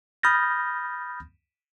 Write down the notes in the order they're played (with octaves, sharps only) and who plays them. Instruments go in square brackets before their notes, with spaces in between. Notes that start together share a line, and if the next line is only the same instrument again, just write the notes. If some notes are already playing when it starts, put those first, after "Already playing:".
[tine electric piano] B5 D#6 F6 G6 A6 A#6